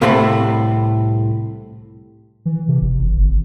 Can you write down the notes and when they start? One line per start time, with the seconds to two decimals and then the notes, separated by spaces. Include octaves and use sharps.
0.01 C2 A2 C3 A3 C4 B5
2.45 E3
2.68 C3
2.81 F#1
2.99 F#1
3.13 G#1